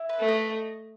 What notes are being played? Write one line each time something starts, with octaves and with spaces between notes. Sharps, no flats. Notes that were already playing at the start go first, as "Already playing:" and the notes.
Already playing: E4
B4
A3
D#5